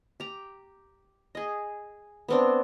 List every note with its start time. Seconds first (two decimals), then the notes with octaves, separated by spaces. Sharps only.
0.20 G4 A#5
1.35 G#4 D#5
2.28 B3 C4 D4